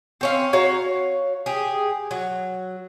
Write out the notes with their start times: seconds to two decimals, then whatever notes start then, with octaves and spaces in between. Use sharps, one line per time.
0.21 C4 C#4 F5
0.53 F#4 C#5 F5 A#5
1.46 G4 G#4
2.11 F#3